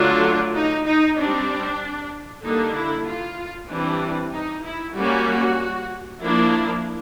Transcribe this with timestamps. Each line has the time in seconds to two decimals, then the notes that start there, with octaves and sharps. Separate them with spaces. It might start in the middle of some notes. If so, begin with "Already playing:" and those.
Already playing: D3 F#3 A3 D4 F4
0.54 D#4
0.86 D#4
1.17 G3 C4 D4
2.43 D3 G3 A#3 D4 D#4
2.75 E4
3.06 F4
3.69 E3 G3 C4 D4
4.33 D#4
4.64 E4
4.95 G3 A#3 C#4 F#4
6.21 F3 A#3 D4 E4